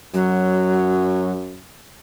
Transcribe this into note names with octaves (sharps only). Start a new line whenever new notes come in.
F#2 F#3